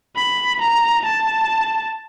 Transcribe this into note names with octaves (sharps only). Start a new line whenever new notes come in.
B5
A#5
A5